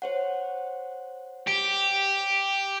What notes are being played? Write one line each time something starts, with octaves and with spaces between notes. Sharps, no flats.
C5 C#5 F#5
G4